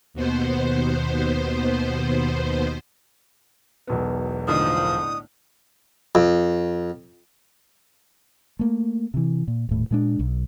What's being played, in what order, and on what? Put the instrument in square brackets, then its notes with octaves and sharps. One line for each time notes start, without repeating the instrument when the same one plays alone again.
[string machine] D#2 B2 B3 C5
[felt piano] E1 B1 B3
[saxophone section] F#2 F3 [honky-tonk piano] A2 D3 D#4 [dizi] D#6
[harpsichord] F2
[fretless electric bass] A3 A#3
C3 E3
A#2
D#1 A2
A#2 G#3 D4
B1